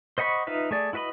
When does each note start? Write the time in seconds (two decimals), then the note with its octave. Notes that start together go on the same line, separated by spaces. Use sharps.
0.18 C5 D#5 F#5 B5 C#6
0.47 D#4 F4 B4 E5
0.71 A3 G#4 D5
0.93 E4 F#4 B4 D#5 B5